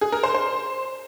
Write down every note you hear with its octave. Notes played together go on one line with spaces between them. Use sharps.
G#4
A#4
C5
C5